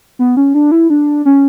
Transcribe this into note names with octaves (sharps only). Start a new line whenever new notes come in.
B3
C#4
D4
E4
D4
C#4